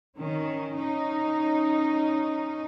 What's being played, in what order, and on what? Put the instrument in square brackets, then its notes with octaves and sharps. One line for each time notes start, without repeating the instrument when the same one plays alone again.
[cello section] D#3 C#4
C#4 D#4